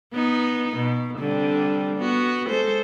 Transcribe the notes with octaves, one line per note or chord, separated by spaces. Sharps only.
B3 D#4
B2
D3 G3 C4
B3 F#4
G#3 A4 C5